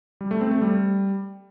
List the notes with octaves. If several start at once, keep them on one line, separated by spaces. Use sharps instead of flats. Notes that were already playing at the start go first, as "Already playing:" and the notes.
G3
A3
C4
A3
G3